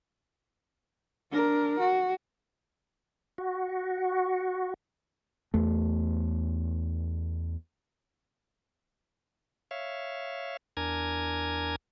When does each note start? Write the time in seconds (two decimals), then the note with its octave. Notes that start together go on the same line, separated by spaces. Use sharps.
1.31 D4 A#4
1.80 F#4
3.38 F#4
5.54 E2 A3
9.71 C#5 E5 F5
10.77 E2 D4 A#4 G#5 A#5 G#6